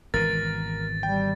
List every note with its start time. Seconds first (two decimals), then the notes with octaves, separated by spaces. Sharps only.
0.14 G#1 B2 E3 A#4 A6
1.03 G3 G5